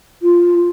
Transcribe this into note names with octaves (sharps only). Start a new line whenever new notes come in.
F4